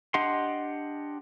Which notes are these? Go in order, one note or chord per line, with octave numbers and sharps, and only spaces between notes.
D4 G4 D#5 F#5 C6